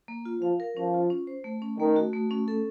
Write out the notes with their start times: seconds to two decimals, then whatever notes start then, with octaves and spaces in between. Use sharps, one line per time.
0.08 A#3
0.25 F4
0.41 F3 F5
0.60 A#4
0.76 F3 C#4
0.94 F4
1.10 C#4
1.27 C5
1.44 A3
1.62 C#4
1.78 D#3 A3
1.96 F#4
2.13 A3
2.31 C#4
2.48 A4